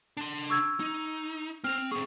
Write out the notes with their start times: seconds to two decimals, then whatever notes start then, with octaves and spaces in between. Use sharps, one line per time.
0.17 D4 C6
0.50 C#6 E6 G#6
0.80 D#4
1.64 C4 F6 F7
1.91 C4 G#4 C#6